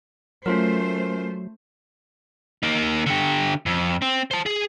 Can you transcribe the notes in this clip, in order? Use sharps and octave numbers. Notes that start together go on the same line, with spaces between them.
F#3 A3 C#4 F4 A#4 C5
A#3 D#4
D3 G4
F2
C4
C5 A5
G#4